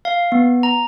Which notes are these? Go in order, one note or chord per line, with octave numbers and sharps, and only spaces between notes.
F5
B3
A#5